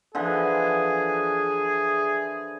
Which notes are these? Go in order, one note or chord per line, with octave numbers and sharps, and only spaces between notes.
D3 E3 F3 G#4